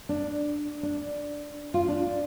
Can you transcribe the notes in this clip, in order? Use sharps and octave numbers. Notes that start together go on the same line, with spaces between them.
D4
D4
F4
D4